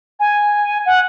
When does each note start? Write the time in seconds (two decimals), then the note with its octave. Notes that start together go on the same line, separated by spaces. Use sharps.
0.20 G#5
0.86 F#5